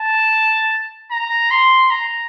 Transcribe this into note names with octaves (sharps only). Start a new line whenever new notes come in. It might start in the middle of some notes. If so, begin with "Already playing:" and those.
Already playing: A5
A#5
C6
A#5